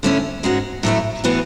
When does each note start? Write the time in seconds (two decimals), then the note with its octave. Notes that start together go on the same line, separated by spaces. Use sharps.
0.03 D3 A3 C#4 E4
0.43 G#2 G#3 C#4 F#4
0.83 A2 F#3 A3 E4
1.24 A2 E3 B3 F#4